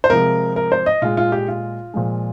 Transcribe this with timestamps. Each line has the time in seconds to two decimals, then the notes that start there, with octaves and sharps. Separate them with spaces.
0.04 C5
0.10 C3 F3 G#3 A#4
0.56 A#4
0.72 C5
0.86 D#5
1.02 A#2 G#3 F4
1.17 F4
1.32 G4
1.48 F4
1.94 A#2 F3 G#3